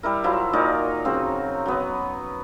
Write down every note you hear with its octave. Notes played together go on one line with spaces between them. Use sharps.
G3 E4 A#4
F3 F#3 E4
A#2 D#4 A#4 D5
C#3 F#3 C4
F#3 B3